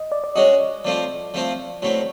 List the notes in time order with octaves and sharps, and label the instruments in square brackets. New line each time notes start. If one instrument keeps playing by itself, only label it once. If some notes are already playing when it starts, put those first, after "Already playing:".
Already playing: [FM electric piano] D#5
D5
D5
[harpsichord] G#3 C#4 F#4 [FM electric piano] D#5
[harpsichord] F3 A3 C4 F4 [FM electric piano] D5
[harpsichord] F3 A3 C4 F4
A2 F#3 A3 C4